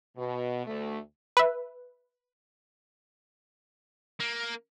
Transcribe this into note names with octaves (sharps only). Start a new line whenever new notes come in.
B2
D2 A3
B4 E5
A#3